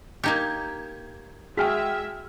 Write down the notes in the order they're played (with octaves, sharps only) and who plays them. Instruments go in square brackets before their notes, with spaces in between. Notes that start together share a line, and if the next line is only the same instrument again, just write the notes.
[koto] A#3 D#4 G4 [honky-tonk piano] G6 G#6
[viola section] G#3 E5 [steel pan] F#4 G#4 [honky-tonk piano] G5 F6 B6